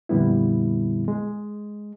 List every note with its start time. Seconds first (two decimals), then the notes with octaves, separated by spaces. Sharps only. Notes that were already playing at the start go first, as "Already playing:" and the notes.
0.09 F2 A#2 D3 G3 B3 E4
1.08 G#3